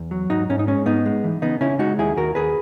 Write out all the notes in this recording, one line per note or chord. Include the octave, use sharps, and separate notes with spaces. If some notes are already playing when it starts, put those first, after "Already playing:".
Already playing: E2
F#3
G#2 D#4 F#4
G#2 C#4
D#4
G#3 C#4
G#2 B3 D#4
G#3
E3
C#3 B3 D#4
C#3 C#4 E4
G#3 D#4 F#4
D#2 E4 G#4
D#2 F#4 A#4
D#2 G#4 B4